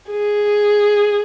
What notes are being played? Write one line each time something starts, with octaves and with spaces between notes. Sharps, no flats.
G#4